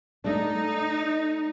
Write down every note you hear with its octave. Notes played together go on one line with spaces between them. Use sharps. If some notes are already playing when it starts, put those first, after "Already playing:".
A3 D4 D#4